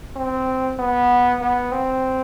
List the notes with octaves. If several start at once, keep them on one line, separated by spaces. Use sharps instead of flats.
C4
B3
B3
C4